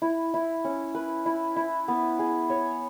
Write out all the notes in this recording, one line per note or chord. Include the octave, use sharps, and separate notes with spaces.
E4
E4
C#4
B4
E4
E4
B3
G#4
C#5